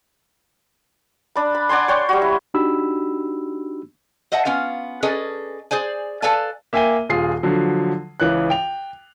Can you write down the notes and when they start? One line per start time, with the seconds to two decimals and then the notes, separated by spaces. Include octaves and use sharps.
1.35 D4 B5
1.55 B5
1.69 D5 F#5 G#5 C6
1.88 C#5 G5 C6
2.09 G3 F#4
2.22 E4
2.54 D4 D#4 F#4 G4 B5 E6
4.32 C5 D#5 E5 F#5 A5
4.45 B3 C#4 F4 F5
5.03 C#4 G#4 A4 B4 D5 D#5
5.71 G#4 C5 D5 G#5
6.22 A4 B4 D5 F5 G#5 A5
6.73 A#3 E5 G5 G#5 D#7 G7
7.09 D#1 F4 G#4 C7
7.43 D3 F3 F#3
8.20 C#2 E3 C#5 F#6
8.50 G5 F7